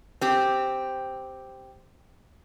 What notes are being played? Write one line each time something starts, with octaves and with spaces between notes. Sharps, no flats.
C4 G4